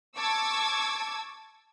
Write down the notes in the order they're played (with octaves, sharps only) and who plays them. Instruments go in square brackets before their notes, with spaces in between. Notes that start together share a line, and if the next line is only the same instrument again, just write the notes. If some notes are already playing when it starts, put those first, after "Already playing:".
[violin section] A5 C#6 D6 E6 G#6